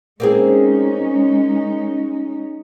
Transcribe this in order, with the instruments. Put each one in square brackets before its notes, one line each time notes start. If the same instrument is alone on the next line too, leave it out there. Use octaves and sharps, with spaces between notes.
[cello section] G#3 C#4 D#4 [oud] A#3 C4 G#4